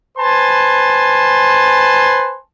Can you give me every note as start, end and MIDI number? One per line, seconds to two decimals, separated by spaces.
0.18 2.36 71
0.18 2.36 72
0.18 2.36 80
0.18 2.36 81
0.18 2.36 84